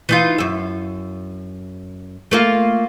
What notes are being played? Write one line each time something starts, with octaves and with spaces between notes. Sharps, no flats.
E3 D#4 F4
F#2 E5
A3 A#3 F4